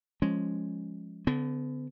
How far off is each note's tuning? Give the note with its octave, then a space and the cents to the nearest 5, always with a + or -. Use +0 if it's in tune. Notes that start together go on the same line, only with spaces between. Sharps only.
F3 +0 G#3 +0 C#4 +0
D3 -25 B3 +40